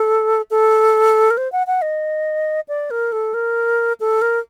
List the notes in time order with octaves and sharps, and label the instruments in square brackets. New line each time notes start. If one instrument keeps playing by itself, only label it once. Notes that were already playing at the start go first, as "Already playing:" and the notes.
Already playing: [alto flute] A4
A4
A#4
C5
F#5
F#5
D#5
D5
A#4
A4
A#4
A4
A#4